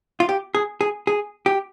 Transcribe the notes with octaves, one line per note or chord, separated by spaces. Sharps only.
F4
G4
G#4
G#4
G#4
G4